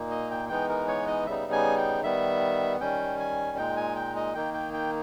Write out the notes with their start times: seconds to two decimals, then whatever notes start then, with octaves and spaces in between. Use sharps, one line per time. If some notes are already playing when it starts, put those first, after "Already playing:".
Already playing: A#2 A#3 D#4
0.11 D#5
0.31 G5
0.49 E3 G#3 B3 D#4 G5
0.69 A#4
0.88 C#5
1.07 D#5
1.26 C#3 G3 B3 D#4 E5
1.52 G#5
1.78 G5
2.03 D#3 G3 B3 E5
2.81 D#3 G3 C#4 G5
3.20 G#5
3.57 A#2 G#3 D#4 G5
3.77 G#5
3.96 G5
4.16 D#5
4.35 D#3 A#3 D#4 G5
4.54 G5
4.74 G5